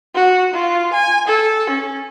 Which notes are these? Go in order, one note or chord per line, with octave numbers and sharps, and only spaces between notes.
F#4
F4
G#5
A4
C#4